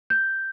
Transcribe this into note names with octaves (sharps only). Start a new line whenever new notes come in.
G6